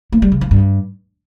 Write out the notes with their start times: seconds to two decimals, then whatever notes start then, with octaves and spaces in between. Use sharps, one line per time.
0.12 A#3
0.22 G3
0.32 C#3
0.41 F3
0.51 G2